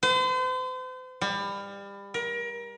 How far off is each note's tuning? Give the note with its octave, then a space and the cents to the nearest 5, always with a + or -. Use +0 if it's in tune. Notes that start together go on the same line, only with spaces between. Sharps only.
C5 -40
G3 +30
A#4 +30